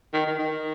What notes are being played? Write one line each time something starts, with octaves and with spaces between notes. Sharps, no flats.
D#3
D#3
D#3